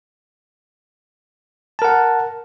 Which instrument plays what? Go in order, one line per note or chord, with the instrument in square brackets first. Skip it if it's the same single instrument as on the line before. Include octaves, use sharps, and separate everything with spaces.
[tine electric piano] A5
A#4
F#5